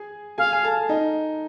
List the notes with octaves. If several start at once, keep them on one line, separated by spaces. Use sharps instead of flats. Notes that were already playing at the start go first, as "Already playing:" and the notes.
Already playing: G#4 G#5
G#4 F5 G#5
G#5
A4 A5
D#4 D#5